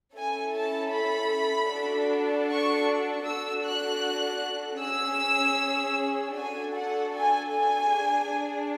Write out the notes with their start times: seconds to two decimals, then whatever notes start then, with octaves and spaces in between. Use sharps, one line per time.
0.16 C#4 E4 A4 G#5
0.55 A5
0.93 B5
1.71 D4 F#4 A4
2.49 C#6
3.26 D4 F#4 A4 E6
3.64 F#6
4.81 C#4 G#4 E6
6.36 D4 F#4 A4 G#5
6.75 F#5
7.13 G#5
7.53 G#5
7.91 D4 G#4